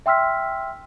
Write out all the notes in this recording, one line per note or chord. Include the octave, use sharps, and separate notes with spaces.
E5 G5 C6 E6 F6 B6